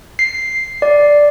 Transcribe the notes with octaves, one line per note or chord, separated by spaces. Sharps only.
C7
D5